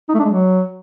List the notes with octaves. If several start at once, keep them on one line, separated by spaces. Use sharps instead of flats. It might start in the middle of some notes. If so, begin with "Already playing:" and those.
D#4
A3
D4
G#3
F#3